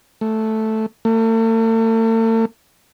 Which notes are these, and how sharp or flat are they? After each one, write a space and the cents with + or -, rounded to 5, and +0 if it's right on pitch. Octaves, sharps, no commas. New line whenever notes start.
A3 -5
A3 +40